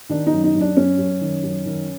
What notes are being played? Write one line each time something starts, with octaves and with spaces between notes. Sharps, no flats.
D#3 D4
D#4
F#2
D#4
F#2
D4
F#2 C#4
F#2
D#3
F#2
D#3